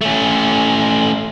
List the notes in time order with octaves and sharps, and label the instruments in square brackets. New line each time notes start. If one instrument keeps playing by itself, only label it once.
[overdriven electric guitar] A3 C#4